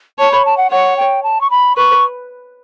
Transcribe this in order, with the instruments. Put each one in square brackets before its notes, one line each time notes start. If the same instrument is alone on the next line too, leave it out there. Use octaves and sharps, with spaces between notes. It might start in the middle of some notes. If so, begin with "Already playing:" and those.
[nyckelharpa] C#5 [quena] A5
[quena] B5
A5
F#5
[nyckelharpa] C#5 [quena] F#5
[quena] G5
A5
C#6
B5
[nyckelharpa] B4 [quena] C#6